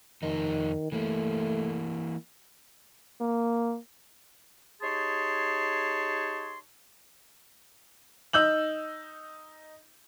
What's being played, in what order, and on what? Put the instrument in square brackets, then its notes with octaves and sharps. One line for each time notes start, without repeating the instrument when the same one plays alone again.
[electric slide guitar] F2 D#4 [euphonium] D#3
[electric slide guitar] E3 A#3 [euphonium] A3
[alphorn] A#3
[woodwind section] D#4 G4 G#4 C#5 A5 C6
[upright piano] D#4 E6 G6 F#7